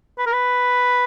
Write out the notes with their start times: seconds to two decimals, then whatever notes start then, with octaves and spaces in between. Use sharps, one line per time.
0.18 B4
0.26 A#4
0.33 B4